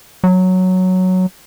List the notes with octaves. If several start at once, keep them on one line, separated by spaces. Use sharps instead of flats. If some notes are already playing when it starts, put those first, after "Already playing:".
F#3